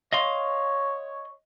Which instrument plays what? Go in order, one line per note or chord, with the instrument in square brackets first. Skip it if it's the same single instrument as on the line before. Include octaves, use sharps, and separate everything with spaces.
[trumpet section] C#5 [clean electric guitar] D#5 F5 C6